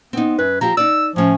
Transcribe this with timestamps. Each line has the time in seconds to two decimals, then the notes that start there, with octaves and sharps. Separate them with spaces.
0.13 B3 C4 D#4
0.39 F#2 B4
0.61 F3 C4 G4 A#5
0.77 D#4 D5 E6
1.16 A2 F3 C#4